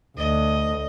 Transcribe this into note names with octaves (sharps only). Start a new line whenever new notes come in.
D2 D#5